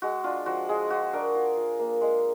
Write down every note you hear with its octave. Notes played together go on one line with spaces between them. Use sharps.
G#3 F#4
D4 F4
F3 F#4
G#3 G#4
F4 F#4
D4 A#4
F4
F4
A#3
G#3